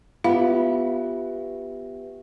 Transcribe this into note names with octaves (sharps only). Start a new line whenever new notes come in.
B3 F4 G4 E5 F5